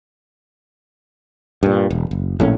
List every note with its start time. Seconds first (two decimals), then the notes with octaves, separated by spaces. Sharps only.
1.63 G2 A#2
1.90 E1
2.11 F#1
2.40 A#1 A2 C#4